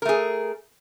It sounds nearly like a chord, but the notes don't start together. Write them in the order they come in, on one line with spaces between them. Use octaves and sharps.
A#4 A3 G#4